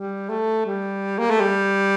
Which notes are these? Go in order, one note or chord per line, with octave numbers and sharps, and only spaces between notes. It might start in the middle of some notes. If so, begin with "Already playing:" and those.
Already playing: G3
A3
G3
A#3
A3
G3